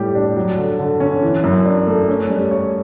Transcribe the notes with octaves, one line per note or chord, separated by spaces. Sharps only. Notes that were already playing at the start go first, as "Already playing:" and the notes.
Already playing: A2 G3 G4
D4
F#3
D3
D3
C#4
E3
F#2
D4
A3
C#4
G3
C#5